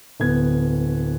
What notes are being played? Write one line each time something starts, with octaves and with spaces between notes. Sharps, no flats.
D1 B3 G#6